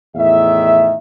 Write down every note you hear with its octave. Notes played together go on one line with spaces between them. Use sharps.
E2 A2 D#3 E5